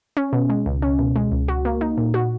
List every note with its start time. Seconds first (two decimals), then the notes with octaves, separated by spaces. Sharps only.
0.17 C#4
0.33 B2
0.50 G#3
0.66 C#2
0.82 C#4
0.99 B2
1.16 G#3
1.32 C#2
1.48 F#4
1.65 A#3
1.81 D#4
1.97 A#2
2.14 F#4